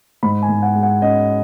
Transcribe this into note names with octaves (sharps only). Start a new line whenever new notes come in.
G#2 B5
G#5
G#2
F#5
G#3
F#5
C#4 D#5